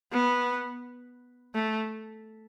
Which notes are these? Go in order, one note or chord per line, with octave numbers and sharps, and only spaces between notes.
B3
A3